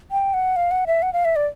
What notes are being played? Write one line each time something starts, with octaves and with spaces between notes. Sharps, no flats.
G5
F#5
F5
F#5
E5
F#5
F5
E5
D5